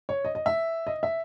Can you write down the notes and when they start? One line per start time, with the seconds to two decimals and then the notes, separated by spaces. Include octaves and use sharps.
0.09 C#5
0.25 D#5
0.35 D#5
0.46 E5
0.87 D#5
1.03 E5